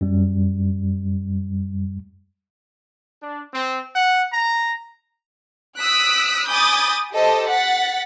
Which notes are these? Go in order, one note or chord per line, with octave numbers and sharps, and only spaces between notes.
F#2 G3
D4
C4
F#5
A#5
D#6 E6 F#6 B6 D7
G#5 B5 D6 D#6 G6 A6
G4 A4 C5 D#5 A5
F#5 A6 B6